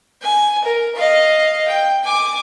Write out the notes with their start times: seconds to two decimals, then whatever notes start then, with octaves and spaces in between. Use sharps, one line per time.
0.22 G#5
0.64 A#4
0.95 D#5 F5
1.67 G5
2.03 G#5 D6